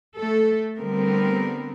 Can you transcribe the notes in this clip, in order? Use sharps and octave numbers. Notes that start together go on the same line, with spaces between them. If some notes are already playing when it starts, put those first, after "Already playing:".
A3 A4
D3 G3 B3 C4 A#4